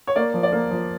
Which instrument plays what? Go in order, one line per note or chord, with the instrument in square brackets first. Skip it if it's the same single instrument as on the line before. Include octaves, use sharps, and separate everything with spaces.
[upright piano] C#5
[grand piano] A#3 [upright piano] D5
[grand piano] F3
[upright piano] D5
[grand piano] A#3
F3